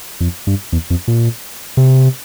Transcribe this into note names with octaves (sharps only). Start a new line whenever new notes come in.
F2
G2
E2
F2
A#2
C3